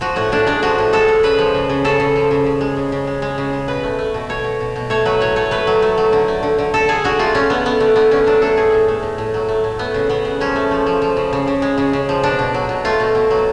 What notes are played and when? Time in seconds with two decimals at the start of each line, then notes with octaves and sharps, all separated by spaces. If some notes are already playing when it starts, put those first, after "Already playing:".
0.01 F3 F#4
0.16 A2 F#4
0.32 A2 D4
0.47 G#3 D4
0.62 F3 F#4
0.78 A2
0.93 G#3 A4
1.08 G#3
1.23 C#3 B4
1.39 F3
1.54 C#3
1.70 C#3
1.85 C#3 A4
2.00 C#3
2.16 F3
2.31 C#3
2.46 C#3
2.61 G#3
2.76 C#3
2.92 C#3
3.07 G#3
3.22 G#3
3.38 C#3
3.53 G#3
3.68 B2 B4
3.83 A3
3.99 A3
4.14 B2
4.29 B2 C#5
4.44 B2
4.60 B2
4.76 B2
4.90 A3 C#5
5.05 F#3 B4
5.20 A2 C#5
5.36 A3 C#5
5.51 A3 B4
5.67 F#3
5.82 A3
5.98 F#3
6.13 D3
6.28 A3
6.43 D3
6.58 D3
6.74 D3 A4
6.88 D3 G#4
7.04 D3 F#4
7.19 A3 F4
7.35 D3 C#4
7.50 D3 B3
7.65 A3 B3
7.80 D3 A3
7.96 D3 B3
8.11 D3 C#4
8.27 F#3 D4
8.42 A3 A4
8.57 A2 G#4
8.72 A2
8.88 A3
9.03 A2
9.18 A2
9.34 F#3
9.48 A3
9.64 A2
9.79 A3 B3
9.94 C#3
10.09 C#3 B3
10.25 C#3
10.40 F3 C#4
10.55 A3
10.71 F3
10.86 F3
11.02 F3
11.17 C#3
11.33 C#3
11.47 C#3
11.62 G#3
11.78 C#3
11.93 C#3
12.09 F3
12.23 B2 D4
12.39 B2
12.54 F#3
12.69 B2
12.85 A3 F4
13.00 B2
13.15 B2
13.31 F#3